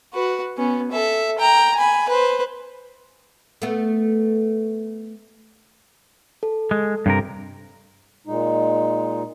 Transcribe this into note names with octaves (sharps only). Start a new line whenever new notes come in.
F#4 B4
B3 C#4
A4 E5
G5 A#5
G#5 B5
B4 C5
A3 B3
A4
G#3
G2 C3 A#4
A#2 G#3 D#4